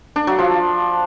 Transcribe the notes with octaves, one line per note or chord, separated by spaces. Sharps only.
D4
F#3
F3